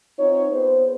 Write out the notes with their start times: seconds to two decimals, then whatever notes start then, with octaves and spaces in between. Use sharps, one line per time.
0.19 C4 D#4 F4 C#5
0.52 B3 G#4 B4 C5